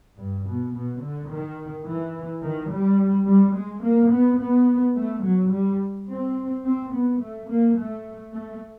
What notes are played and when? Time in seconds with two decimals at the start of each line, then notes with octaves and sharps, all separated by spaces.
0.17 G2
0.46 B2
0.74 B2
1.01 D3
1.30 D#3
1.86 E3
2.43 D#3
2.70 G3
3.26 G3
3.55 G#3
3.83 A#3
4.11 B3
4.39 B3
4.96 A3
5.24 F#3
5.52 G3
6.08 C4
6.65 C4
6.92 B3
7.20 A3
7.49 A#3
7.77 A3
8.33 A3